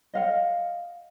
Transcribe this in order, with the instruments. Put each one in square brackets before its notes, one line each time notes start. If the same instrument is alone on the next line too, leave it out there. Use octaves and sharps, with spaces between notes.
[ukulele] D#5 F5 F#5